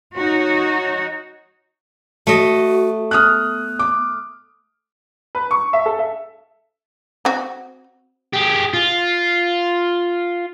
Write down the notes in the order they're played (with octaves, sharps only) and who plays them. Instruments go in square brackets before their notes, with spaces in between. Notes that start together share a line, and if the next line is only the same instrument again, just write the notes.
[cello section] D#4 F#4 C#5
[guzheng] A3 D#5 [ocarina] F#4
[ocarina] B3 [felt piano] D#6 F6 F#6
[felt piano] D6
[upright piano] B4
C#6
E5
A4
E5
[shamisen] C4 F#4
[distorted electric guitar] G4 G#4
F4